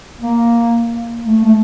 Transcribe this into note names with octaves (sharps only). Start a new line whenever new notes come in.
A#3
A3
A3